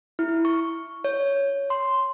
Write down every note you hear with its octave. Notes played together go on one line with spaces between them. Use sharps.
E4
C#6
C#5
C6